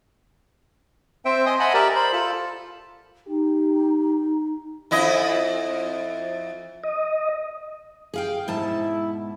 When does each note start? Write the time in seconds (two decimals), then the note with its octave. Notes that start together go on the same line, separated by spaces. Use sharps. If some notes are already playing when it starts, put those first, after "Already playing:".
1.25 C4 C5 E5 G5
1.46 D#5 G#5 C6 D#6
1.60 D#5 E5 F#5 G#5 A5 B5
1.74 G4 A#4 D5 E5
1.95 C5 B5
2.13 F4 A4 A5
3.28 D#4 G4
4.91 F2 E4 D#5
6.84 D#5
8.14 G#4 F5 G5
8.48 G#2 B2 E4 A5